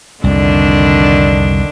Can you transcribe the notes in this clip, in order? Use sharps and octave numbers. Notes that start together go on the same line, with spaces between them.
C2 F2 D3 D#3 D4